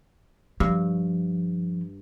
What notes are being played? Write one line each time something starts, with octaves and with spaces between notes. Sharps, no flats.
G2 F3